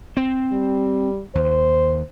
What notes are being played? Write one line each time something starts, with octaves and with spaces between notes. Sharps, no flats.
C4
G3
D#2 C5